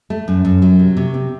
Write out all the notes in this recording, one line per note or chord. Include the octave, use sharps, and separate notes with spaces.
A3
F#2
F#2
F#3
C3
C3
C4